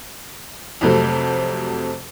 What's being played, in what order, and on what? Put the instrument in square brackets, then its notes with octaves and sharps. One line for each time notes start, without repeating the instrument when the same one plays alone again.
[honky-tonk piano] F2 C3 F#3 A3